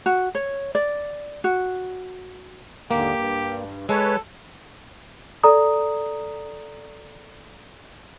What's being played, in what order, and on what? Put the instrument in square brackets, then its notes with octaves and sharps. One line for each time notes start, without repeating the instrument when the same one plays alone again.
[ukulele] F#4
C#5
D5
F#4
[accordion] D#2 G#2 D3 [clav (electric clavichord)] A#3 [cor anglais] G4
[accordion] G2
[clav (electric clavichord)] G#3 [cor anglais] A4 [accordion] B4 C#5
[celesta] A4 D5 A#5 D#6